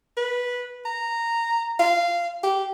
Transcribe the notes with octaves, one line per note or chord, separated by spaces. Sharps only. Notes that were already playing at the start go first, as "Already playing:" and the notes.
B4
A#5
F5
G4